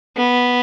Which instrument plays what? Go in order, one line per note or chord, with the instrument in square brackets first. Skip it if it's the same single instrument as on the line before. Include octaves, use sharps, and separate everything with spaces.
[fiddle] B3